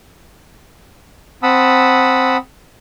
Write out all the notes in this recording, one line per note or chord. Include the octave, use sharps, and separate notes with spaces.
C4 F#5 A5 B5 D#6 E6